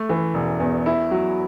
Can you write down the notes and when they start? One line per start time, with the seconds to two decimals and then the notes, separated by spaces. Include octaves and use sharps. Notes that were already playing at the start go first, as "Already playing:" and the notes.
Already playing: A3
0.09 E3
0.34 E1
0.60 E2
0.86 E4
1.11 F#3